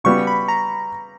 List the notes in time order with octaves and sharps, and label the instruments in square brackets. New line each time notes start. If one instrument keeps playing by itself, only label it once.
[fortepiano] C#3 G3 B3 F#4 [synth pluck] C#6
[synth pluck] B5
A#5